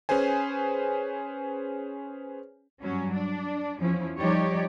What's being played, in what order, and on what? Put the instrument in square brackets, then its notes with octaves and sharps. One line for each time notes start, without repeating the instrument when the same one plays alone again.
[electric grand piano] C#4 G#4 B4 C5 G#5
[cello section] G2 F#3 C#4
D4
E2 F3 C#4 E4
F3 G3 D#4 G4 C#5 D5